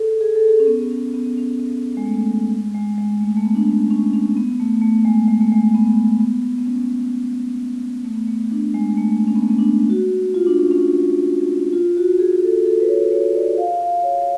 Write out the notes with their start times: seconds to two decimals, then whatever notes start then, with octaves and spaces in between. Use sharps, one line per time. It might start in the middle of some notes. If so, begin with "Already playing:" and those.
Already playing: G#4 A4
0.21 G#4
0.35 A4
0.48 G#4
0.60 C#4
0.67 B3
0.91 C#4
1.14 B3
1.27 B3
1.37 C#4
1.60 B3
1.97 G#3
2.06 A3
2.52 G#3
2.74 G#3
2.98 G#3
3.21 A3
3.37 A3
3.44 B3
3.55 D4
3.67 C#4
3.91 C#4
4.13 C#4
4.37 B3
4.60 A3
4.82 A3
5.05 G#3
5.28 G#3
5.41 A3
5.52 G#3
5.75 B3
6.20 B3
6.58 B3
6.66 C#4
8.05 A3
8.16 B3
8.27 A3
8.51 D4
8.74 G#3
8.97 A3
9.27 C#4
9.35 B3
9.43 A3
9.50 B3
9.58 D4
9.90 F#4
10.34 F4
10.47 D4
10.59 C#4
10.71 C#4
10.81 D4
11.73 F4
11.97 F#4
12.19 G#4
12.36 G#4
12.43 A4
12.65 A4
12.80 B4
12.89 C#5
13.12 C#5
13.35 D5
13.58 F5
13.81 F5
14.03 C#5
14.22 C#5